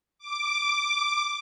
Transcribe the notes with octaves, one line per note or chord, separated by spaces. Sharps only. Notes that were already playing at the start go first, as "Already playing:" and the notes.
D6